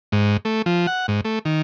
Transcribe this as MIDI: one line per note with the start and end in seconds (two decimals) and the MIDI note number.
0.12 0.37 44
0.45 0.62 57
0.66 0.87 53
0.87 1.06 78
1.08 1.21 44
1.25 1.39 57
1.45 1.62 51